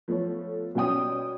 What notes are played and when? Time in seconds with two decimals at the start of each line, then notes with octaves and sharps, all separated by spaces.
0.08 F3 A3 B3 A4 C#5
0.75 B2 G3 C#4 G5 D#6